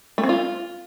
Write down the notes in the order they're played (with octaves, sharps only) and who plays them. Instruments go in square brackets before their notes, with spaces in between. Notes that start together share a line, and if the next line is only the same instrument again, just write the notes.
[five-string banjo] A3
C4
F4